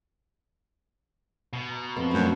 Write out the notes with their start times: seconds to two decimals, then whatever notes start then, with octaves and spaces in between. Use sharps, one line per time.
1.53 B2
1.71 A#5
1.84 A#5
1.96 F2 B3
2.13 F#2 A3